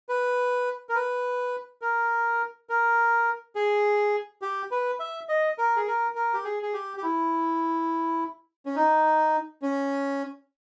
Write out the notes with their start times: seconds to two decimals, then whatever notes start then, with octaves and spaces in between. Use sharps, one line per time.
0.09 B4
0.89 A#4
0.95 B4
1.82 A#4
2.70 A#4
3.55 G#4
4.42 G4
4.71 B4
5.00 E5
5.29 D#5
5.58 A#4
5.76 G#4
5.87 A#4
6.15 A#4
6.33 G4
6.44 G#4
6.63 G#4
6.73 G4
6.97 G4
7.03 E4
8.66 C#4
8.76 D#4
9.62 C#4